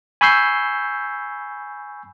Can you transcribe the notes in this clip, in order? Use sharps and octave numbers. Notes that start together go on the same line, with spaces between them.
G#5 B5 C#6 E6 G6 C7